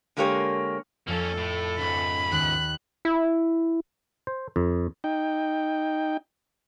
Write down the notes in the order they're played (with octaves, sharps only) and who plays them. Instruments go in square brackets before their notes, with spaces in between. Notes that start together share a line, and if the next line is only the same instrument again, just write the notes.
[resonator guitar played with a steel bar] D3 G#3 A#3 G4 C#5
[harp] F2 F5 E6 [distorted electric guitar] A#3 C#4 [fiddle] A4
[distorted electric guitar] A2
[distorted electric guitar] C#2 G#2 [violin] B5 [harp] C#7
[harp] D#2 [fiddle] F#6
[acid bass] E4
[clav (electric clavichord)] C5
F2
[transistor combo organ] D#4 G5